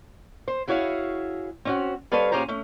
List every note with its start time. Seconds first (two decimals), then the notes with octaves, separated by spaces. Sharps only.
0.48 C5
0.67 E4 F#4 G#4 C#5 E5 F5
1.65 C4 C#4 F#4
2.12 G3 C4 A4 B4 C#5 F5
2.32 A#2 C#4 G4 G#4 C5 A#5
2.48 A3 C#4